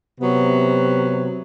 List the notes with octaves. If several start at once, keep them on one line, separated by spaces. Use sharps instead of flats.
C3 F#3 B3